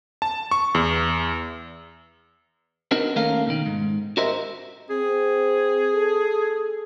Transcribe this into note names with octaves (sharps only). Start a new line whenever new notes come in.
A5
C#6
E2
B3 C4 D4 D#4 F#4 A#4
D#2 A3 C#4 A4 A#4 F5
B2 D#3
G#2
F#4 G4 A#4 C5 D#5 E5
C4 G#4
A4